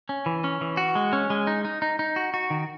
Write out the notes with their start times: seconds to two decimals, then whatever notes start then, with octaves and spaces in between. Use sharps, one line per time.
0.09 C#4
0.26 E3
0.44 C#4
0.61 E3
0.77 F#4
0.95 G#3
1.13 C#4
1.30 G#3
1.47 D#4
1.65 D#4
1.82 D#4
1.99 D#4
2.16 F#4
2.34 F#4
2.50 D#3